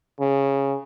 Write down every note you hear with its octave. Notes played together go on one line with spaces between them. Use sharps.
C#3